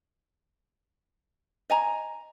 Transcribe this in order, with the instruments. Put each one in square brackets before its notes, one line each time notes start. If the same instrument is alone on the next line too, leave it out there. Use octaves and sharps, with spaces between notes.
[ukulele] D#5 G#5 A#5